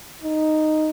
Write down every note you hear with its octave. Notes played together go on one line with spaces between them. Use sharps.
D#4